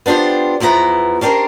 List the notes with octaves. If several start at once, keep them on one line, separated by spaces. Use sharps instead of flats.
B3 D4 F4 G4 C5
E2 F3 B3 E4 A#5
C#4 D4 G4 A#4 C5